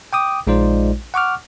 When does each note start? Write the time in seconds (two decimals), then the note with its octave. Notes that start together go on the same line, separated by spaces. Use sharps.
0.13 G5 D6 D#6
0.47 A#1 G#3 D#4 F4 C5 D5
1.14 F#5 C#6 D6 F6